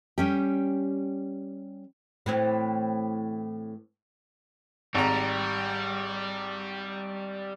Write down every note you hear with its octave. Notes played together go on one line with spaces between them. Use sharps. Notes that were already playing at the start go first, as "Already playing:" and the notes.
G3 C#4 G4
A2 E3 C4
G#1 G3 A#5